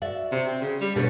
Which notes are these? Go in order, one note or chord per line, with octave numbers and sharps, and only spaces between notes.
F#4 D5 E5
C3
C4
C#3
G3
G2 B2 B4 C#5